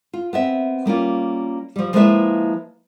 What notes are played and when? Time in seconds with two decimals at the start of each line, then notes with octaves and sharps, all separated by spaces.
0.13 F4
0.33 B3 C4 E5
0.86 G3 A#3 C#4 F4
1.76 F3 G3
1.93 F3 G#3 A#3 E4 B4 E5